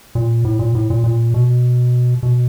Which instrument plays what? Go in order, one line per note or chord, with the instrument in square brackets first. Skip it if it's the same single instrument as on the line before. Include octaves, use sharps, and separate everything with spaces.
[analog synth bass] A#2
A2
A#2
A2
A#2
A#2
B2
B2